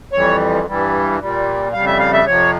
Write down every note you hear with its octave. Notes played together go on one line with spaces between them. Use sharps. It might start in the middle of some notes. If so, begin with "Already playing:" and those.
F2 E3 G3 C#5
G2 E3 G3
A#2 G3
F2 C#3 G3 F5
E5
F5
E5
F2 C3 F3 C#5